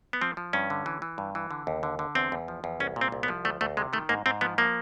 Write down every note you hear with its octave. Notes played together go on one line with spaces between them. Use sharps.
B3
F3 C4
F3
G2 C#4
D3
E3
E3
G2
E3
D3
D#2
D3
D3
E2 C4
E2
F3
E2
C2 C#4
A#2
C4
C2
B3
F3
D2 A3
D2 A3
C3 G#3
D#3 A3
G#2 A#3
G#2 C4
F3 B3
F3 A#3